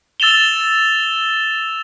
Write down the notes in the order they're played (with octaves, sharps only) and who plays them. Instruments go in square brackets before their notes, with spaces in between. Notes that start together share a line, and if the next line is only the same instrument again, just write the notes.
[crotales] E6 A6 E7 F7 G7